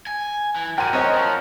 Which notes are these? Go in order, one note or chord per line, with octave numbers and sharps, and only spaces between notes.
G#5
E3
G2 A#4 C5 D5 F#5 G5 D#7
C4 C#4 C#5 D#5
F3